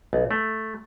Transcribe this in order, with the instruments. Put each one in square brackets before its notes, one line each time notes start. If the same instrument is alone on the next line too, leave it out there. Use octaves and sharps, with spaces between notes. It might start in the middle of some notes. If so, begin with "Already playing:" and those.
[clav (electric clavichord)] B1
A3